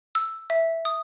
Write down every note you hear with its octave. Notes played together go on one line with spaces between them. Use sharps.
E6
E5
D#6